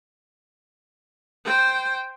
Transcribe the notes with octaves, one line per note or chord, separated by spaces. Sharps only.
C5 G5